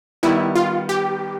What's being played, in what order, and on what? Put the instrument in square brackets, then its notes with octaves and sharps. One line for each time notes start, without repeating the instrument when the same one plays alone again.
[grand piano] D#3 G3 B3 [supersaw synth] E4
[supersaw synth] F4
G4